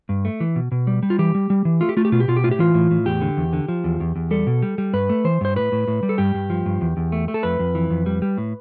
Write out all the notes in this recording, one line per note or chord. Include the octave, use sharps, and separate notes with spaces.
G2
A3
E3
B2
B2
G3
G3
F4
E3 G4
G3
G3
E3
A3 F4
G4
A3 F4
G4
B2 F4
G4
B2 F4
G4
A2 F4
G4
E3 F4
A2
A2
E2 G4
D3
E2
D3
F3
E2
E2
E2
G3 A4
B2
G3
G3
G2 B4
A3
E3 C5
G2 C5
A2 B4
A2
A2
G3
A4
G2 G4
G2
F3
G2
E2
E2
A3
A3
A4
F2 B4
F2
E3
F2
G3
G3
A2